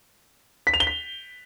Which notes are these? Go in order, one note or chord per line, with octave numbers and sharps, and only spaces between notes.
B6
F7
G7
B6